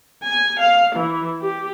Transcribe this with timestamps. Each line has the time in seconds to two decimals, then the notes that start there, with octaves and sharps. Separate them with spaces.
0.23 G#5
0.59 F5
0.96 E3
1.41 G4